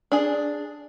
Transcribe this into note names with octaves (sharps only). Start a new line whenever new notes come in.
D4 G#4